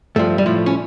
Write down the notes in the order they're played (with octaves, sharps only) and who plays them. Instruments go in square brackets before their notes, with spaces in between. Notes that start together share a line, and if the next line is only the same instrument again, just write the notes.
[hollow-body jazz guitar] G2 F3 A3
G3
A2 F3 A3
C#4